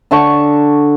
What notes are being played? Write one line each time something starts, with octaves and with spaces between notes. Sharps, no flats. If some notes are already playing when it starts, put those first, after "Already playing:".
D3 A5 C#6